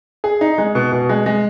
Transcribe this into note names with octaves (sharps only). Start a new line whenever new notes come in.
G#4
D#4
G#3
B2
B2
G#3
G#3